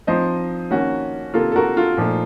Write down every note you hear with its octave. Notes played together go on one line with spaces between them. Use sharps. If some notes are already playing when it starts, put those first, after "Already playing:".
F3 C4 D#4 C5 D#5
D#3 A#3 C#4 F#4
C3 D#3 A#3 F4 A4
A4
F#4 A#4
F4 A4
A#2 F3 A3 D#4